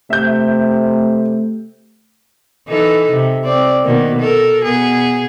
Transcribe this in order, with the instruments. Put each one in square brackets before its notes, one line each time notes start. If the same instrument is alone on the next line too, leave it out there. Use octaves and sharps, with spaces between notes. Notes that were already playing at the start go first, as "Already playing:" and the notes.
[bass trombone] C3 [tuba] A3 [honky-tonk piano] E5 G6
[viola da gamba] E3 D#4 A4
C3
C4 D5
B2 D#3 A#3
A4 A#4
B2 B3 G#4